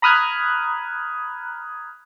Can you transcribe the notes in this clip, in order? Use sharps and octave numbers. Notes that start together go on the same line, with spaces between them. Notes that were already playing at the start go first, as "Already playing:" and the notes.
A#5 B5 D#6 F6 F#6 G#6